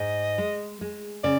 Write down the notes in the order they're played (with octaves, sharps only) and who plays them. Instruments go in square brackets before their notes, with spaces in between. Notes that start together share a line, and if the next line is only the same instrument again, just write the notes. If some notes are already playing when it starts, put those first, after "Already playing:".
Already playing: [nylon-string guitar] G#2 [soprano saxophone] D#5
[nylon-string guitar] G#3
G#3
[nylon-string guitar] C#3 [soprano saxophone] D5